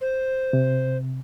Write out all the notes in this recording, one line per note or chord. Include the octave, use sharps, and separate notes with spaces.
C5
C3